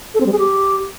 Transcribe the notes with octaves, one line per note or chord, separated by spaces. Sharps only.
A4
C4
G3
G#4
G4